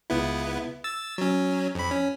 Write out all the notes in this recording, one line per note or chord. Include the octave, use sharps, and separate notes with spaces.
C#2 B3 E4
E6 A6
F#3 C#4
F2 B5
C#4